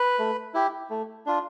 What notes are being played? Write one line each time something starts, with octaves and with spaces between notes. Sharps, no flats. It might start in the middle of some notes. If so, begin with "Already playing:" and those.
Already playing: B4
A3
E4 G4
A3
D4 F4